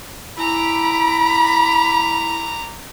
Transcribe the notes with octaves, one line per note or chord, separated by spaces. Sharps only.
E4 G#5 A#5 B5 D6 E6